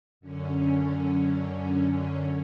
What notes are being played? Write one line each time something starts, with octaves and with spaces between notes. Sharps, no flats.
F#2 D3 C#4